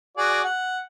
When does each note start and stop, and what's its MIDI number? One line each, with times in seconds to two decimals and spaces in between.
0.17 0.42 66
0.17 0.42 68
0.17 0.42 74
0.45 0.80 78